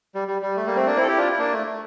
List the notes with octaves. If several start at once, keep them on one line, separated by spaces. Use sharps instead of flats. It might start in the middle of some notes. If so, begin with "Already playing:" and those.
G3
G3
G3
A3
G3 A#3
A3 C4
A#3 D4
C4 E4
A4
E4 G4
D4 F4
E4
A#3 D4
A3
A3